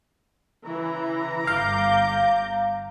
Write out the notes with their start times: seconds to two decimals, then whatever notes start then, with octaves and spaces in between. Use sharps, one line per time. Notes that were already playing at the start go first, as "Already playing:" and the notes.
0.65 C#3 E3 A#5
1.47 G1 F5 D6 G6